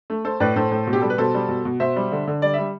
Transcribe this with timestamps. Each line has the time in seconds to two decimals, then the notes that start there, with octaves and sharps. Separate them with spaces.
0.10 A3
0.25 A3 A4 C5
0.40 A2 B4 D5
0.56 A2 A4 C5
0.71 A2
0.87 B2
0.93 G4
1.01 G3 A4
1.10 B4
1.18 B2 A4 C5
1.34 G3
1.49 B2
1.65 B2
1.80 B2 C5 E5
1.96 G3
2.12 D3
2.27 D3
2.42 G3 D5
2.54 G3 E5